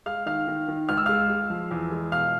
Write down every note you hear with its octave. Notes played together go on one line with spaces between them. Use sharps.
G#3 F5 F6
D#3 F5 F6
D#3
D#3
C#2 F6
E6
G#3 F5 F6
G#3
F3
E2
G#3
B2 F5 F6